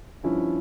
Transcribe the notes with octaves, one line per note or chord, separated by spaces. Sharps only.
G2 F3 C#4 E4